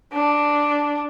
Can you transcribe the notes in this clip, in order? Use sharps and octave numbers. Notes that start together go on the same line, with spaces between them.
D4